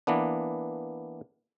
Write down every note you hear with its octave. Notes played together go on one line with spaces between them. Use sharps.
E3 A#3 B3 D4